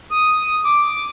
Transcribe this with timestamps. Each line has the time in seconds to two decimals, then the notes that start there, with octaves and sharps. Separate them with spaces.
0.11 D#6
0.64 D6